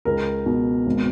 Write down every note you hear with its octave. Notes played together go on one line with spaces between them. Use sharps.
C#2 A#4
B2
G#1